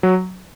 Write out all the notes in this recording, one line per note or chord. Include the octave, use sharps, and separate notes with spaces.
F#3